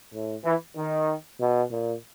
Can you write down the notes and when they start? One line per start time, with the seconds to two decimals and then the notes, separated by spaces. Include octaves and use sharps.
0.14 A2
0.45 E3
0.77 D#3
1.41 B2
1.71 A#2